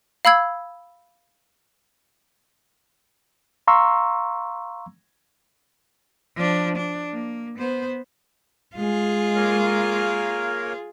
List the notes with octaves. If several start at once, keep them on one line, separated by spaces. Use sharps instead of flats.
F5 B5 E6 G#6
F5 A#5 C6 C#6 E6
F3 D4
D4
A#3
B3 C5
G#3 F4 G#4
A#3 A#4 C#5